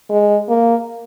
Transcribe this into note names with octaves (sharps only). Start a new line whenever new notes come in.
G#3
A#3